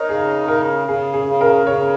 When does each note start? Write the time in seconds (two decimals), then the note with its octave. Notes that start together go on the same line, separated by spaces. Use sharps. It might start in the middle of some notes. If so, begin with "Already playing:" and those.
Already playing: D#4 A#4 C#5
0.09 C#3 G#4
0.48 C#3 A#4
0.88 C#3 G#4
1.14 G#4
1.28 C#3
1.41 A#4
1.67 C#3 C#5